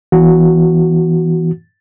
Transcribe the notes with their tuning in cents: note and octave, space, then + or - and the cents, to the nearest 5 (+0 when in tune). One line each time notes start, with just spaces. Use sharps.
E3 +0 B3 +0 F#4 +0